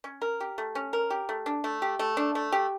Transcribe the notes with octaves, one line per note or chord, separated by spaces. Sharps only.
C#4
A#4
G4
A3
C#4
A#4
G4
A3
D4
A3
G4
A3
D4
A3
G4